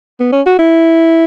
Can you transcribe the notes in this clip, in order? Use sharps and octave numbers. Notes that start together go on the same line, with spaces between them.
B3
C#4
F#4
E4